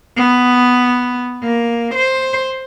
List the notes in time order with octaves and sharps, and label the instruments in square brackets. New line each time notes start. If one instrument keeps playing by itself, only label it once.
[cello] B3
A#3
C5